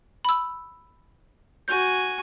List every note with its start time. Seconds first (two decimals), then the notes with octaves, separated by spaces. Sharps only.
0.25 B5 E6
1.68 F#4 G#5 G6